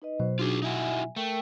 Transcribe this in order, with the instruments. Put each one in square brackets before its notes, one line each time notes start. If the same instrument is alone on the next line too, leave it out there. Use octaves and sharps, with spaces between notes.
[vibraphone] D#4 B4 D#5
[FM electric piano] B2 F#3 [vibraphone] C5
[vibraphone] D4 D#4 F#4 [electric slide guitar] F4 G#4
[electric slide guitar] D#4 E4 F#4 [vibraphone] E5 G#5
[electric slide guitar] A3 [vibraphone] A#4 G5